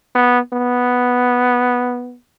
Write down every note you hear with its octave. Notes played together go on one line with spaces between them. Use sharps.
B3
B3